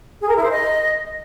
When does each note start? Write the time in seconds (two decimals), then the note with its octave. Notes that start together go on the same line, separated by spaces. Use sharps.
0.21 G#4
0.29 A#4
0.36 E4
0.43 C5
0.50 D#5